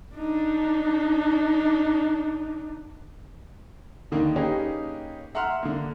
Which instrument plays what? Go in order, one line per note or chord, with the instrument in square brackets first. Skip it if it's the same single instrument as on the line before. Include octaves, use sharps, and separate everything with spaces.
[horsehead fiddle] D4 D#4
[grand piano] D#2 D3 D#3 A#3
A#3 C#4 D#4 G4 G#4 B4
E5 F#5 A#5 C6 F6
D3 A#3